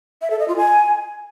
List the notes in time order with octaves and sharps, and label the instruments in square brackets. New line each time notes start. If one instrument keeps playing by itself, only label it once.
[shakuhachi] E5
A4
D#5
F4
G#5